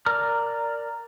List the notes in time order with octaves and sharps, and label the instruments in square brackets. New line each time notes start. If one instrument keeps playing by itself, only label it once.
[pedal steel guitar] A#4 D5 A#5 F6